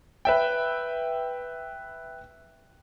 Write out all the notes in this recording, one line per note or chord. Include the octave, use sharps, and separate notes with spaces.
B4 E5 G5